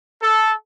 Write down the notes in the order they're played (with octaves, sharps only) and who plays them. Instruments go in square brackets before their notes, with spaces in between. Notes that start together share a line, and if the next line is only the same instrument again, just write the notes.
[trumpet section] A4